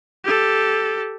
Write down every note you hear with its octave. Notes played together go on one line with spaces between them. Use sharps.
G4 A4